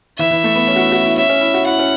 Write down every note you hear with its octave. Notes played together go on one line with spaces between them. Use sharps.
E3 E5
E3
A3
B3
C#4
F#4
E4
F#4
E4
C#4 E5
C#4
E4
F#4
E4 F#5
C#4